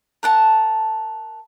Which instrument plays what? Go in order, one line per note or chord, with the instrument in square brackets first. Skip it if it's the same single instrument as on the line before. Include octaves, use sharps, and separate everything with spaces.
[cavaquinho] A#4 F#5 A5